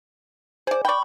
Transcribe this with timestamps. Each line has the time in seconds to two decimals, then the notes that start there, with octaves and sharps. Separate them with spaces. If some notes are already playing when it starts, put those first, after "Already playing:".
0.67 G#4 C5 D5
0.85 D5 G5 B5 C#6